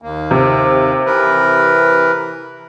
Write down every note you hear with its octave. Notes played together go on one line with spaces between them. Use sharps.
D#2 A#3
C3
E3 A#4 B4